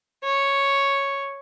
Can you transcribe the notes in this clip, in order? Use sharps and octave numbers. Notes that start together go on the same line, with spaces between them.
C#5